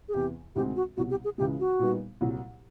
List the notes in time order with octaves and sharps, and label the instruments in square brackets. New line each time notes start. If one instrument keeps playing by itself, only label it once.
[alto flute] G#4
[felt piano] E2 C3 E3 [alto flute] G4
[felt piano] D2 C3 D#3 G#3 C4 [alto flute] G4
[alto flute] F#4
[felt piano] C2 B2 F#3 [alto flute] F#4
[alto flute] G4
G#4
[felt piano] C#2 C#3 E3 G#3 [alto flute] G4
[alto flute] F#4
[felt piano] A#2 G3 B3 D#4
C2 A#2 F#3